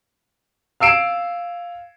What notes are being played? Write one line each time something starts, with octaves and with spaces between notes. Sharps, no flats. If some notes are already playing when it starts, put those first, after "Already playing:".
F5 E6 C7 D7 E7